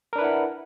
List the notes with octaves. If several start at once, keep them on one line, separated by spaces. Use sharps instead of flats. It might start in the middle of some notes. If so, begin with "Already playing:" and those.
D4 E4 A#4 B4 F#5